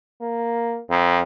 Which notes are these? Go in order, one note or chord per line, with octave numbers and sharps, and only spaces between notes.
A#3
F2